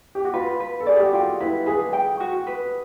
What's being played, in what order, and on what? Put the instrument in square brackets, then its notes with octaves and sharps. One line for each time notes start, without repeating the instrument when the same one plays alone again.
[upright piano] G4
F#4
[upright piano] F4 [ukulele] B4
[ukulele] B4
[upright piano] A4
[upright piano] G#4 [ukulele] D5
[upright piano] G4
F#4
[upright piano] F4 [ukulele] G5
[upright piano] E4 [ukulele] B4
[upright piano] G#4 [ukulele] B4
[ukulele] G5
F#4
B4